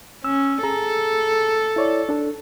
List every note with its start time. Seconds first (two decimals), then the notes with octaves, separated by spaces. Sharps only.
0.24 C#4 E6
0.63 G#4 A4 A#5
1.76 E4 C#5 D5
2.09 D4 A4